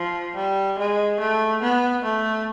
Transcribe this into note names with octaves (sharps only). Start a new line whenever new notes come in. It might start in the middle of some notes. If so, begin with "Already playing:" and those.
Already playing: F3
G3
G#3
A3
B3
A3